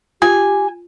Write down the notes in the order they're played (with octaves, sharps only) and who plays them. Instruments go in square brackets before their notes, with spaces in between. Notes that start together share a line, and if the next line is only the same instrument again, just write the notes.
[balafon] F4 [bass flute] G4 [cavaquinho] G#5